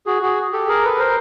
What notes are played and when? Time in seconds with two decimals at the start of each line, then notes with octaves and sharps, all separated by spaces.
0.06 F#4 G#4
0.22 F#4 G#4
0.53 G4 A4
0.68 G#4 A#4
0.83 A4 B4
0.99 A#4 C5